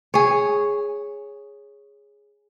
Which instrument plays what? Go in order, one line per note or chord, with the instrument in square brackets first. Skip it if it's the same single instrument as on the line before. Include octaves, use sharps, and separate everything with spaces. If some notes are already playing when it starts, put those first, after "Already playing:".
[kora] G#4 C#5